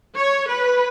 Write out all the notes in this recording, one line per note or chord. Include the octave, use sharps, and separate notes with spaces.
C#5
B4